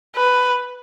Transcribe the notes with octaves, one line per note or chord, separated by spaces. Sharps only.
B4